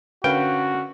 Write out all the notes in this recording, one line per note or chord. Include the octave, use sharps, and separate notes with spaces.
D3 C#4 F#4 A#4 B4 F5 G5